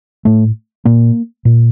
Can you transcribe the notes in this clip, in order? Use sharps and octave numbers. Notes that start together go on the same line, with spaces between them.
A2 A3
A#2 A#3
A#2